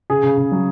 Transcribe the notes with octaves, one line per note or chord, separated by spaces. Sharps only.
C#3 G#4
C#3
C#3
F#3